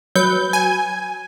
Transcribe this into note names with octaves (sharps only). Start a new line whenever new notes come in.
F#3 B4 G6
G#5